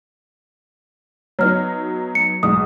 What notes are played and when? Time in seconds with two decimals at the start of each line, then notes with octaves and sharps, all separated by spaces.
1.39 F#3 B3 D#4 C#5 F6
2.15 C#7
2.43 B1 G#2 D#6